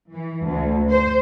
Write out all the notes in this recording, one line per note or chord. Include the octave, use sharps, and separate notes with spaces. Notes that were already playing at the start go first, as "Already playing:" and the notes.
E3
D2
C5